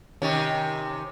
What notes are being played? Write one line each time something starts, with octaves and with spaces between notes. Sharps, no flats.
C3 D#3 C#4